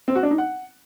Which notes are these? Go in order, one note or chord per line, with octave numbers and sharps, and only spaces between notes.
C4
F#4
D4
D#4
F#5